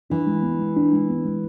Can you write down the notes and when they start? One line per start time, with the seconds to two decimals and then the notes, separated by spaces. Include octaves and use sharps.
0.10 E3 D4
0.27 G#3
0.43 B3
0.59 G#3
0.77 D4
0.93 G#3
1.09 B3
1.25 G#3